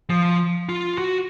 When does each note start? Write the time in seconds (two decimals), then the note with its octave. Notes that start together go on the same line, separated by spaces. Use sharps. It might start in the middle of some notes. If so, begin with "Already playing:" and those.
0.10 F3
0.69 F4
0.98 F#4